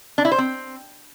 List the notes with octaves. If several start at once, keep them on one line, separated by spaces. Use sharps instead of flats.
D4
E4
C5
C4